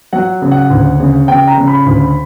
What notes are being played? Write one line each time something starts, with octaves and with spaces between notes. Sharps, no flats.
F#3 F#5
C#3
F#5
D2
C#3
C#3 G5
A#5
C#3
B5
D2